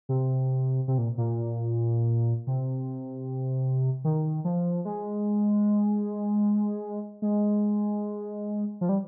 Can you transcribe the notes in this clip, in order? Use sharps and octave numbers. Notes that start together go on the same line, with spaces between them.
C3
C3
A#2
A#2
C3
D#3
F3
G#3
G#3
F3
G3